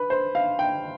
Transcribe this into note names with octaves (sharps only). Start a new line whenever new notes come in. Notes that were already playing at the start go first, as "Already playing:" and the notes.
Already playing: B4
C5
F5
G5